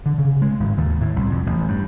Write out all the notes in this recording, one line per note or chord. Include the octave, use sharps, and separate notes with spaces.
D3
C#3
G#3
G#1
D#2
A2
C2
F2
A1
G2